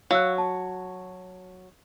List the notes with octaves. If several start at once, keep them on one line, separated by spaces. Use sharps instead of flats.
F#3 F5 E6 F#6
A5